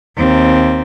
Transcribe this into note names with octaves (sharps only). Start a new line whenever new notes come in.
D#2 C4